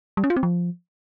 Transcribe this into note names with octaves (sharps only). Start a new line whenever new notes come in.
G3
C#4
F4
C4
F3